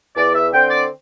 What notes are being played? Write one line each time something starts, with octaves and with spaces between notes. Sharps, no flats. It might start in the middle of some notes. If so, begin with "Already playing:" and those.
E2 D5
E5
D3 C4 G5
D5